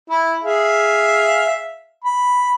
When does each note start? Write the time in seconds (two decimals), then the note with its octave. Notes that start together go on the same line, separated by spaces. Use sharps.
0.10 E4
0.44 G#4 E5 F5
2.04 B5